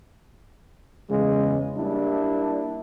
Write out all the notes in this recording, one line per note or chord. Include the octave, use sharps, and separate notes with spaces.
E2 C#3 G#3
G3 A#3 D4 E4